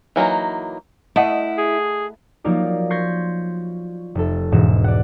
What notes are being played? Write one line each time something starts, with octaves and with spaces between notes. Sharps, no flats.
E3 F#3 A#3 D#4
A3 E4 D#5 F#5
G#4
F3 F#3 A#3 D#4 A#4 D5
C6 C#6 G6 G#6 A#6 B6
F1 A4
E1 G#2 B2 E7
D5 F#5